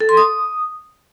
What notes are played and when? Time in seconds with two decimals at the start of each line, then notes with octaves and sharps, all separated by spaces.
0.01 A4
0.09 C6
0.17 D#6